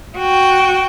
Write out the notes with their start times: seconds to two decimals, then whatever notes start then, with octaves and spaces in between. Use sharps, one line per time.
0.18 F#4 G5